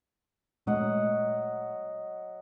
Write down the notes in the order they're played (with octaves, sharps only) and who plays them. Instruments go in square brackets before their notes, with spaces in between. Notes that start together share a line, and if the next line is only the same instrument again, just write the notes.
[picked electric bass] A#2 G#3 A3 [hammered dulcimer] F#3 D#5 F#5